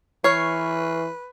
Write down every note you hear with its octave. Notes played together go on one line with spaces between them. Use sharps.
E3 B4 C#5 C#6 F6 C7